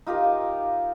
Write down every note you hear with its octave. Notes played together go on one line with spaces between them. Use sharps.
D#4 F4 G4 A#4